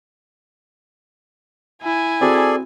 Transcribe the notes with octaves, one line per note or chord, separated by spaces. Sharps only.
E4 G#5
C4 F#4 G#4 A4 D5